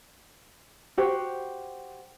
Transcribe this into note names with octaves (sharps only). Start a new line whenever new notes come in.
F#4 G4 C5